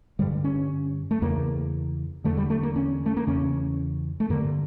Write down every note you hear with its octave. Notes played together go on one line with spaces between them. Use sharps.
G2 D3 G3
C#4
A3
E2 C#3 A#3
E2 D3 A3
G3
A3
A#3
C#4
A3
A#3
E2 C#3 C#4
A3
G2 D3 A#3